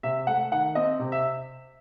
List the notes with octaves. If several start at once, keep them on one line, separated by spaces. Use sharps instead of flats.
C3 E5
A3 F#5
D#3 F#5
C4 D#5
C3
E5